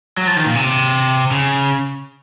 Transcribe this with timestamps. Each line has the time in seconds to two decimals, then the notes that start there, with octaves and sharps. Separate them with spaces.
0.17 F#3
0.27 F3
0.36 D#3
0.46 A#2
0.56 C3
1.31 C#3